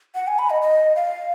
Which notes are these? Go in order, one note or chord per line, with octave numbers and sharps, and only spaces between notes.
F#5
G#5
B5
D#5
D#5
F5